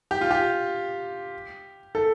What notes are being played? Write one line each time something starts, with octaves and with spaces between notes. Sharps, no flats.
G4
F4
G4
A4